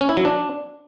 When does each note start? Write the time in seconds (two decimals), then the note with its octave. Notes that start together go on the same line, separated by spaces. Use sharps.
0.01 C#4
0.09 E4
0.17 F#3
0.25 D4